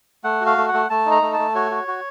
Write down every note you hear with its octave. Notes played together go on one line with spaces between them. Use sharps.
A3 F#5
F#4
F5
A3
F#5
A3
A3 A5
D#4
A#5
A3
A5
A3
F#4 C#5
F#4
F#4